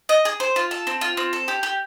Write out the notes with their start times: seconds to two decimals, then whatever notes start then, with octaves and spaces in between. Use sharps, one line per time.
0.09 D#5
0.25 G#4
0.40 C5
0.56 F4
0.71 A4
0.87 C4
1.01 F4
1.17 C4
1.33 A4
1.48 G4
1.63 G4